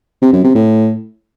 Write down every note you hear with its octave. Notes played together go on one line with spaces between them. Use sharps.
C3
F#2
C3
A2